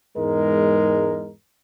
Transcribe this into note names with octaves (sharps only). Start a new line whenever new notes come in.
E2 G#2 G#3 A#4